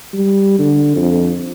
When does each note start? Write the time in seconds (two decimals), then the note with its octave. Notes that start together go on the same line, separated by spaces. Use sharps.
0.13 G3
0.59 D3
0.96 F2